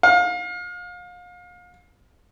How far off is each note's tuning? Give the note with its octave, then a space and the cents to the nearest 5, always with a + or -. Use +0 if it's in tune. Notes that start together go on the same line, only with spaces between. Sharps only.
F5 +35